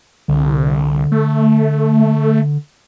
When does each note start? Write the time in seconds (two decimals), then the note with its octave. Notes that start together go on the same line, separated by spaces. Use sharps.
0.28 C2 D3
1.12 A3